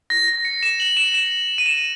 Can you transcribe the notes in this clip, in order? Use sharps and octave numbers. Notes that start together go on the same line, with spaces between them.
A#6
A#6
C#7
E7
F#7
E7
E7
D#7
E7